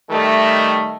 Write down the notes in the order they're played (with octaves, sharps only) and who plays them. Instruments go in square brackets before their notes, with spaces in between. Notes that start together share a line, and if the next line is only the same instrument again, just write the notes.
[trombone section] D#3 G3 A3